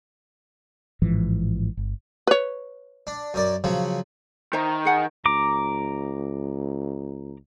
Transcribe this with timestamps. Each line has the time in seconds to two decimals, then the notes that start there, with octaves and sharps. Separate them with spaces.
1.02 A1 G#2 E3 F3
1.77 G1
2.27 B4 C#5
3.07 D4
3.34 F#2 A#4 D5
3.64 C#3 F3 F#3
4.53 D#3 C5 E5 A#5
4.85 G#4 F#5 G#5
5.26 C#2 A#5 D6